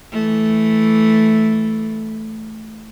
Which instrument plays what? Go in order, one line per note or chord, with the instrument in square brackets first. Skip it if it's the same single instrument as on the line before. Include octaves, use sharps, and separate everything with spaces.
[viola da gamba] E3 A3